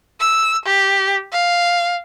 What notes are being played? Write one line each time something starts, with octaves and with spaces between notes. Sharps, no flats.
E6
G4
F5